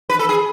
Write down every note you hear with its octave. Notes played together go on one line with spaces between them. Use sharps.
B4
A4
G#4